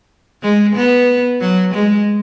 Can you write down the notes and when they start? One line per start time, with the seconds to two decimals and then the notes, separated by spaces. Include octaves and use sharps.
0.43 G#3
0.75 B3
1.41 F#3
1.74 G#3